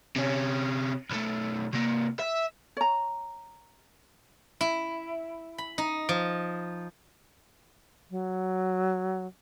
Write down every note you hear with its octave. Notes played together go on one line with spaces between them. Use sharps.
C3 C#4
B1 A3
C3 A#3
E5
C#5 A#5
E4
B5
D#4
F3
F#3